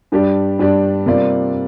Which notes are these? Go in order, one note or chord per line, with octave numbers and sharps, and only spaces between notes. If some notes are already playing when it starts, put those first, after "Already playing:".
G2 G3 D4 G4 D5
G2 G3 D4 G4 D5
C3 G3 A#3 F4 D5